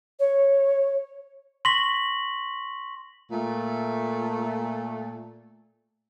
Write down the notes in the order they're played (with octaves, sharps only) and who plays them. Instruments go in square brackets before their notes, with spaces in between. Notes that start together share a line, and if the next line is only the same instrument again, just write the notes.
[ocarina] C#5
[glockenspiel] C6 C#6 A#6 B6 F#7
[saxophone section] A#2 A3